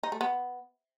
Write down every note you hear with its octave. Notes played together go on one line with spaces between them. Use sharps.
D#4
A3
B3